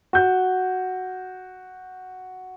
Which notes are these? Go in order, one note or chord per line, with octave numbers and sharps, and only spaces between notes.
F#4 G6